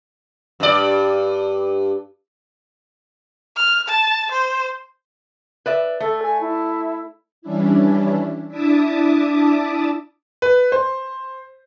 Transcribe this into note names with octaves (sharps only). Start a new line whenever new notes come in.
G2 D5
F6
A5
C5
B4 D5 E5
A3 A4
G#5
E4
E3 G3 C#4 D4 E4
D4 E4 E5 A5 D6 D#6
B4
C5